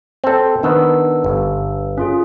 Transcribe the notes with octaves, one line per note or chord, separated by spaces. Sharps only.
C4 A4
D#3 B3 D4 E6
G1
C#4 F4 G#4